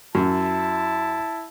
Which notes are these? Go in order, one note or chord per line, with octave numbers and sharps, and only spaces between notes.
F#2 E4 A5